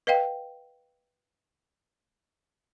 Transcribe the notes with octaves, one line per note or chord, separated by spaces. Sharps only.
B4 D#5 F5 G5